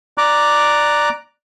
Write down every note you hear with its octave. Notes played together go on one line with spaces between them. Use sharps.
D5 A#5 D6 F#6